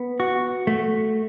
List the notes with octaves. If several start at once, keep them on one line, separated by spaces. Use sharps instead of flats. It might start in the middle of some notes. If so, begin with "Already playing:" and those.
Already playing: B3
F#4
A3